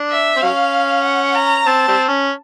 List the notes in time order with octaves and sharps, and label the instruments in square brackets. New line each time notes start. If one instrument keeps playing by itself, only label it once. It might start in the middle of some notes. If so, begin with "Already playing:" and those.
Already playing: [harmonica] D4
[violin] E5
[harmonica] C4
[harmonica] F#3 C#4 [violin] F5
[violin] F#5
A#5
[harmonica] C4 [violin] A5
[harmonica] G3 C4
C#4